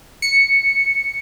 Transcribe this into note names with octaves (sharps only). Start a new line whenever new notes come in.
C#7